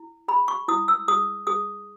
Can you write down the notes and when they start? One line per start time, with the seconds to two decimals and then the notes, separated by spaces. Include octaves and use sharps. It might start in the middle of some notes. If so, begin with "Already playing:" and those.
Already playing: E4
0.28 G#4 B5
0.48 C#6
0.68 E4 D#6
0.88 E6
1.08 G#4 D#6
1.47 G#4 D#6